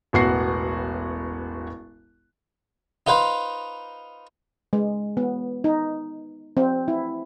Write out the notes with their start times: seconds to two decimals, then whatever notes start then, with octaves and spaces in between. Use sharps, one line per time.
0.13 E1 A1 B3 F#4 F#5 C7
3.07 D#4 F4 B4 C5 F5
4.73 G#3
5.17 B3
5.64 D#4
6.57 C4
6.88 E4